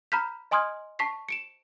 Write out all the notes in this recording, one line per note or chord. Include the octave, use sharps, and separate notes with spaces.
A#5 B5 F6 G6 B6
D#5 G#5 C6 D#6 F6 G#6
A5 C#6 B6 C7
C#7 D7 E7